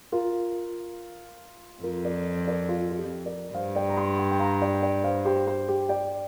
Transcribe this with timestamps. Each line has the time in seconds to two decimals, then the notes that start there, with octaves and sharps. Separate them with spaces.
0.12 F4 A#4
1.83 F2 F4 A#4
2.05 A#4 D5
2.47 A#4 D5
2.69 F4
2.90 F4
2.97 G4
3.25 A#4 D5
3.54 G2 C5 F5
3.76 D5 G5
3.89 A#5
3.97 G5 C6
4.18 G5 C6
4.31 G5
4.40 F5 A#5
4.61 D5 G5
4.82 D5 G5
5.04 C5 F5
5.25 G4 C5
5.46 G4 C5
5.68 G4
5.89 D5 G5